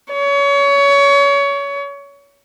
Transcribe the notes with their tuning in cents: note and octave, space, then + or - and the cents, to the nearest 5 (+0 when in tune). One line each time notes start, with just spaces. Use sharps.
C#5 +25